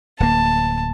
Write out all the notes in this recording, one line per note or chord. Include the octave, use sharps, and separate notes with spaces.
D1 A#3 A5